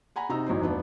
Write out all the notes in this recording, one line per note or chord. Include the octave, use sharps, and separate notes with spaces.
F#5 G#5 A#5 B5
C3 D#4 A#5 E6
G#1 F#3 E4 C5
E1 F3 B3 D4